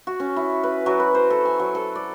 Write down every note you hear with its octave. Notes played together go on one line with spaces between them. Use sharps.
F#4
C#4
E4
B4
F#3
B4
C5
A4
G#5
F#3
A4
D5